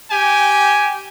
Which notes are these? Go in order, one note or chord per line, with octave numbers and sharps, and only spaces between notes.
G4 G5 G#5